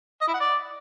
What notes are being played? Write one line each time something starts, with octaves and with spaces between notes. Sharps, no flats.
D#5
E4
F#5
D5